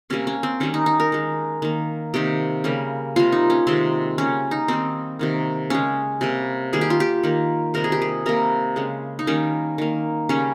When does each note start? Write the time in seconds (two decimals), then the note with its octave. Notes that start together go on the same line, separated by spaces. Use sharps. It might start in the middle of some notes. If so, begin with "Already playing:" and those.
0.10 C3 G3 A#3 C#4
0.27 C#4
0.43 C4
0.60 D#3 G3 A#3 C#4
0.74 D#4
0.86 D#4
1.00 A#4
1.12 D#3 G#3
1.62 D#3 A#3
2.14 C3 D#3 A#3 G4
2.64 C#3 G3 A#3
3.16 C3 G3 A#3 F4
3.32 D#4
3.50 C#4
3.67 C3 D#3 G#3 C4
4.18 C#3 G3 A#3 C#4
4.51 D#4
4.68 D#3 G3 A#3 C4
5.19 C3 D#3 A#3
5.70 C#3 G#3 C#4
6.21 C3 G3 A#3
6.73 D#3 G3 A#3 G#4
6.81 G4
6.90 F4
7.00 G4
7.23 D#3 A#3
7.74 C3 D#3 G3 A#4
7.84 G#4
7.92 G4
8.02 G#4
8.26 C3 G3 A#3 A#4
8.76 C#3 G#3
9.19 D#4
9.27 D#3 G3 A#3 C#4
9.78 D#3 A#3
10.29 C#3 G3 A#3 C#4